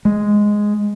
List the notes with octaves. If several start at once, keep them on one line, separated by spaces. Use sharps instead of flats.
G#3